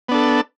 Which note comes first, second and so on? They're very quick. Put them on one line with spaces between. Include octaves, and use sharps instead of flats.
B3 D4 A4